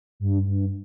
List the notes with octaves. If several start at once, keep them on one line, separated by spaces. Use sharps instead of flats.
G2
G2